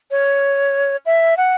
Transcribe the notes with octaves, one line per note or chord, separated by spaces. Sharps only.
C#5
E5
F#5